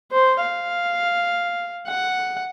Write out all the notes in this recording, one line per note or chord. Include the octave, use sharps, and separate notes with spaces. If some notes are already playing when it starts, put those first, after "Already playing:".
C5
F5
F#5